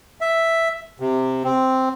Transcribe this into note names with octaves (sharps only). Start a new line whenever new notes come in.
E5
C3
C4